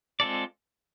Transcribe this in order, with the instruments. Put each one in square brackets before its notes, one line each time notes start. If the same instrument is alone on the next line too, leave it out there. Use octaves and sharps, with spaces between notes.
[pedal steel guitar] G#3 C4 F4 A4 D5